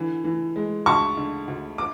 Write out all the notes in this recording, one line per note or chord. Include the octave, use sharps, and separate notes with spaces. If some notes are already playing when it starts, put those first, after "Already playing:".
Already playing: D3 E3
E3
G#3
D2 A5 C#6
D3
D2
D6